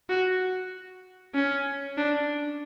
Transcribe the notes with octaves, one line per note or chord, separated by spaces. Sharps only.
F#4
C#4
D4